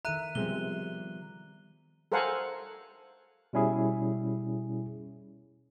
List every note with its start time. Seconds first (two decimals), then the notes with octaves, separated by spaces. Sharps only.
0.05 D#3 A4 E5 A#5 F#6 D#7
0.35 C3 F3 G3 G#3 B3 G7
2.12 A4 A#4 C5 F5 F#5 G#5
3.53 B2 G3 C#4 E4 G#4